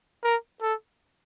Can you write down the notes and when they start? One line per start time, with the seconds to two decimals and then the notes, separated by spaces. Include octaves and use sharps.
0.24 A#4
0.62 A4